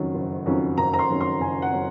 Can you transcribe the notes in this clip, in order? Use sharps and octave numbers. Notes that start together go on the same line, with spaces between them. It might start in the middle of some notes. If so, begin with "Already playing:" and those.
Already playing: F#1 F2 D#3 F#3 C#4
F#1
F2 D#3 F#3 C#4
F#1 A#5
A#5
C6
F2 D#3 F#3 C#4
C6
F#1 G#5
F#5
F#3 C#4